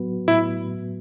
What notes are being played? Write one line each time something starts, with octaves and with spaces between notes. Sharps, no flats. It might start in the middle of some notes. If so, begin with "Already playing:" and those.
Already playing: A2 F#3 B3 F#4 B4
A2 E4